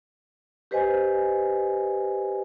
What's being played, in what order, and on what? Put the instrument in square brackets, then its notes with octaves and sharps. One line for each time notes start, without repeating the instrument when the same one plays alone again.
[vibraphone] G4 B4 C5 D#5 G#5